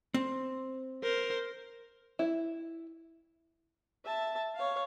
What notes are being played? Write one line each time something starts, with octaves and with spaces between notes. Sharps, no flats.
C4
A#4 C5
E4
E5 A5
C#5 F5